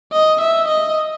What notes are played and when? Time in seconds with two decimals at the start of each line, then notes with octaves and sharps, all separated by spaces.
0.13 D#5
0.41 E5
0.68 D#5